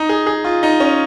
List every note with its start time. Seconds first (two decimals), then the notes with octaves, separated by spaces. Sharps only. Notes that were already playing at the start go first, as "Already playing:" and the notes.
Already playing: D#4
0.09 G#4
0.27 G#4
0.45 F4
0.63 D#4
0.80 C#4